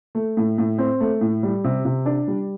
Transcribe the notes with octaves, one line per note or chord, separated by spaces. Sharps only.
A3
A2
A2
C4
A3
A2
G3
C3
C3
D4
G3